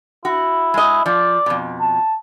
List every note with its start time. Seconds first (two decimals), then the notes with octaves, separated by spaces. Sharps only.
0.25 E4 F#4
0.74 G#3 D#5
1.06 F3 D5
1.46 F2 B2
1.81 A5